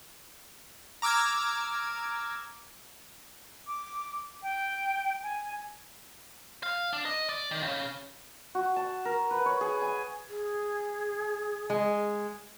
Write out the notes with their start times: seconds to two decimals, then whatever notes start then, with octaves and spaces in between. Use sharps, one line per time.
1.02 A#5 D6 E6 F6 G#6
3.66 D6
4.42 G5
5.23 G#5
6.63 F5
6.93 D4
7.05 D#5
7.29 D5
7.51 D#3
7.63 C#3
8.55 F#4
8.76 A5
9.05 A#4
9.31 B4
9.46 C#5
9.61 G#4
9.82 G#5
10.28 G#4
11.70 G#3